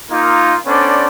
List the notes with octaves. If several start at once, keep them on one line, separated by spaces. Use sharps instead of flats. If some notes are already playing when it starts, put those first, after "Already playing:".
A#3 D#4 F4
B3 C#4 D4 A4 C5 D5